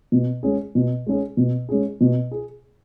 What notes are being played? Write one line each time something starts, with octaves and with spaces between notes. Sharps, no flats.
B2
G#3 C#4 G#4
B2
G#3 C#4 G#4
B2
G#3 C#4 G#4
B2
G#4